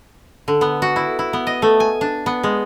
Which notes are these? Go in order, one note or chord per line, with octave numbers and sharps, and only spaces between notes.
D3
B3
F#4
E4
E4
B3
D#5
A3
G#5
D4
B3
G#3